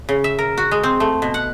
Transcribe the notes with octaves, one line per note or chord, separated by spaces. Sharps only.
C#3
E5
A#4
F#4
G#3
C4
A3
B2
F#5